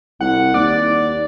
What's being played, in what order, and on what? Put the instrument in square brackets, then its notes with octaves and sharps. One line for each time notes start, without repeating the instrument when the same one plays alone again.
[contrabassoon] C2 [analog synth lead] F#5
[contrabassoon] D#2 [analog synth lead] D5